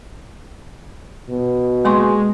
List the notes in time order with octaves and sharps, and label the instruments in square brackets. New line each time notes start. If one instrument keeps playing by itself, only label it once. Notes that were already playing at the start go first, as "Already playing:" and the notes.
[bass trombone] B2
[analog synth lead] G#3 [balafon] A#3 C6 C#6